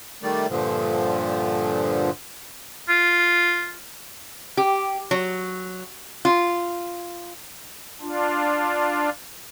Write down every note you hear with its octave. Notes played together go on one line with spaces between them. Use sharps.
D#3 G3 A3 D5
G2 A#2 D3 F3
F4
G4
F#3
F4
D4 F4